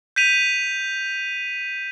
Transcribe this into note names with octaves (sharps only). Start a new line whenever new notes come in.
G6 B6 D#7 F7